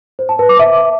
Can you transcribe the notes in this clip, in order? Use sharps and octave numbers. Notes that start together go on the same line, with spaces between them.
C5
A5
B4
D6
E5